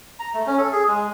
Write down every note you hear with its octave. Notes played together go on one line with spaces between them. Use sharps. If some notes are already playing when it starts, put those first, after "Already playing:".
A#5
A3
C#4
A4
G#4
G#3